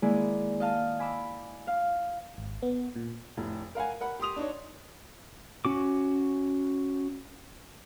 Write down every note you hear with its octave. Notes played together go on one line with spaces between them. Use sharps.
D#3 G#3 A#3 E4 G#4 D5
D#5 F5 A5 F6
G#5 B5 D6 E6
F5
G#1
B3
A#2
F1 A2
A#4 F5 F#5 G#5
A#4 F#5 B5
G4 C6 D#6 F7
D4 D#4 C#5
C#4 F#4 D6